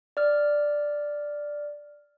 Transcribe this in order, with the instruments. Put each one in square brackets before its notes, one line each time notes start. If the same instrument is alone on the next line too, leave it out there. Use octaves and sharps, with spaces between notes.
[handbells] D5 F6